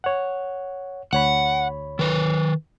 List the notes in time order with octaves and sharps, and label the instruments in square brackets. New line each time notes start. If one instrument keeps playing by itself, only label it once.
[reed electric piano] C#5 F#5
[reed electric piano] D2 C#5 B5 [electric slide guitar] F#5
[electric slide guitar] D#3 B4